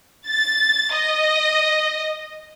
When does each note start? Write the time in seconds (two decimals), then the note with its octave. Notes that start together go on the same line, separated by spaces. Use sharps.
0.27 A6
0.94 D#5